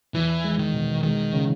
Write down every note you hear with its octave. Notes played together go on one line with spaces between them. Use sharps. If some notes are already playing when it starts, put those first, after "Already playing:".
E2 E3
G#3
D#3
B2
D#3 G#3
C#3